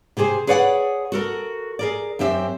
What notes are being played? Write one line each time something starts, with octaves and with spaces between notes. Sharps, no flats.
C3 G4 G#4 C5
G#4 B4 C#5 D5 F5 F#5
F#4 A4 A#4
G#4 A#4 D5
F#2 C4 G4 E5